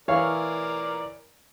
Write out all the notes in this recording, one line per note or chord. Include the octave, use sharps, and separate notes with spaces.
E3 A#4 C#5 D5 F5